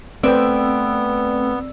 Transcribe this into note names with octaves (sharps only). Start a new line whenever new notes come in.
A3 B3 C4 B4 D5 G5 E6